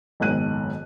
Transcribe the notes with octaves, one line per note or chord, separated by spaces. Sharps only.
F#1 B1 G#2 D#3 F#6 D#7